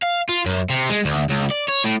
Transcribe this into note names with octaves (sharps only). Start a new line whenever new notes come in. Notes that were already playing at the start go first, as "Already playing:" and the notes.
F5
F4
F#2
C3
G#3
D2
C#2
D5
C#5
A2